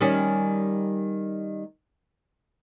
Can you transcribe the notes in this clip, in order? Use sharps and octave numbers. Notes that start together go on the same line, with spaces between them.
D#3 G3 C#4